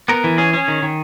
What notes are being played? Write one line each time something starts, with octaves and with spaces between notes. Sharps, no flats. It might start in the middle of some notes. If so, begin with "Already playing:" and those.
B3 A#4
E3
C#4 G#4
C#4
D#3
D#3